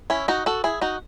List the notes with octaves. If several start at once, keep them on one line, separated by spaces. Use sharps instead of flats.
C#4 E4
D#4 F#4
F#4 A4
E4 G#4
D#4 F#4